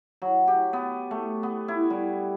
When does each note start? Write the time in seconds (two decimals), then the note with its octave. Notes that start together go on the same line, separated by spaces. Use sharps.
0.22 F#3
0.48 G4
0.73 B3
1.11 A3
1.43 B3
1.68 E4
1.90 G3